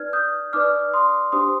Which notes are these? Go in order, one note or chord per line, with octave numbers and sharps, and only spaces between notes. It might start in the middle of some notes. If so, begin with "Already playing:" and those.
Already playing: D#4 B4 D5 F6 G#6
D#6 G6
D#4 B4 D5 D6 F6
C6 D#6
D4 G4 C5 C6 D#6